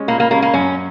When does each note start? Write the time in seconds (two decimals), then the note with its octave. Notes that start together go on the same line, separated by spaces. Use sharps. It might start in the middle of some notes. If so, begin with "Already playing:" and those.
Already playing: G#3 C#4
0.08 A#2 A#3
0.20 A#3
0.31 G#3 A#3 C#4
0.42 A#3
0.54 F#2 C#4